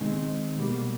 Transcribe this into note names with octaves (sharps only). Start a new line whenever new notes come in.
D#3 G#3 C4 D#4
B2 G3 A#3